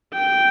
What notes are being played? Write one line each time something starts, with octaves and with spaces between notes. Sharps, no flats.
G5